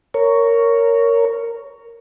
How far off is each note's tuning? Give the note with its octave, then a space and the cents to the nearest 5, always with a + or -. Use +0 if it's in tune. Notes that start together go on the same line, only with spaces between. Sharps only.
A#4 -10 C#5 +10